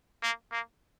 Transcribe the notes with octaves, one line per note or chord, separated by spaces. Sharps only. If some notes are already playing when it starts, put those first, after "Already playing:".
A#3
A#3